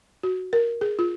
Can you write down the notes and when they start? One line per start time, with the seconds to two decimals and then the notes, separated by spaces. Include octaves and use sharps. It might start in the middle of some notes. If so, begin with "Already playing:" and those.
0.23 F#4
0.53 A#4
0.81 G#4
0.99 F4